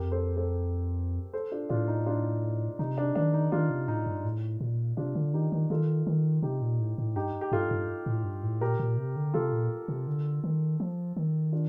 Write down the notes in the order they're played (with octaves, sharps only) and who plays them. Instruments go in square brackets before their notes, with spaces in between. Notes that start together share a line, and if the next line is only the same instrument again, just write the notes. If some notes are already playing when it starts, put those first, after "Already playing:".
Already playing: [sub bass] F2 [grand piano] G4 A#4
[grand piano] A4 C5
A4 C5
A4 C5
D4 F4
[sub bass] A2 [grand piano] D4 F4
[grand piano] D#4
D4 F4
[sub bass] C3 [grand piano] D#4
[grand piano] D4
[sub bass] D#3 [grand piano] D4
[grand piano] D#4
[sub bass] D#3 [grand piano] D4 F4
[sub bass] C3
[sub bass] A2 [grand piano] D#4
[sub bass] G2
A2
A#2
[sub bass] C3 [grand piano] D4 F4
[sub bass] D3
[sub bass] D#3 [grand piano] D#4 G4
[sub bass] D#3
[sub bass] D#3 [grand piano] F4 A4
[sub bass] D#3
[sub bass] C3 [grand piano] D#4 G4
[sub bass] A#2
A2
A2
[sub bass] G2 [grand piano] D#4 G4
[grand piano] G4
[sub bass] G2 [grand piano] F4 A4
[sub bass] G2
A2
G2
A2
[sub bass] A#2 [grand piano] G4 A#4
[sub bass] A#2
C3
D3
[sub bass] C3 [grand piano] F4 A4
[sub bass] A#2
C3
D3
D#3
F3
D#3
[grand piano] D4 F4